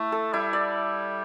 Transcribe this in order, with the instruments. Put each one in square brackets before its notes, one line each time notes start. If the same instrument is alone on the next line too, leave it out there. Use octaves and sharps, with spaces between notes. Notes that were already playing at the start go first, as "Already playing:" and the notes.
Already playing: [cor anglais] A3 [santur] E4
[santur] A4
[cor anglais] G3 [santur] E4
[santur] D5